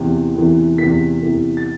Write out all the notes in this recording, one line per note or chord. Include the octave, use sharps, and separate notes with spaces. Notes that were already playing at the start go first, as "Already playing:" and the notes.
Already playing: E2 C3 E3
E2 C3 E3
E2 C3 E3 B6
E2 C3 E3
A6